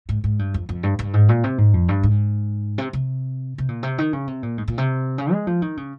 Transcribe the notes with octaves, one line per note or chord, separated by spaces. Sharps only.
G#2
G#2
G2
F2
F2
G2
G2
G#2
A#2
C3
G#2
F2
G2
G#2
C3
C3
C3
A#2
C3
D#3
C#3
C3
A#2
G#2
A#2
C3
C#3
G#3
F3
D#3
C#3